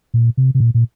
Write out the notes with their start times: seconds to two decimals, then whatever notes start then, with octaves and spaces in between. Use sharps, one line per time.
0.14 A#2
0.37 C3
0.55 C3
0.60 A#2
0.74 A#2